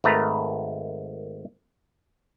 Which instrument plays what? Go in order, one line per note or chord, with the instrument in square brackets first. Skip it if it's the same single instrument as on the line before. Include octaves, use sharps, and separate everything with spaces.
[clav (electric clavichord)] G#1 D#3 A3 B4 A#5